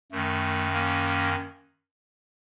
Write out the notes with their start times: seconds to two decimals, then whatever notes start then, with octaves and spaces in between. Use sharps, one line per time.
0.12 F#2 D#3 A3
0.74 A#3 C#4